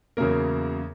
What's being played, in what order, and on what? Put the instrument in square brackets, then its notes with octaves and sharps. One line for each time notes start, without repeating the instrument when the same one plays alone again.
[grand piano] E2 C#3 F#3 A#3 A#4